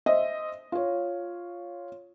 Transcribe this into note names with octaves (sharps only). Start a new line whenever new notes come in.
C5 D#5 E5
F4 C#5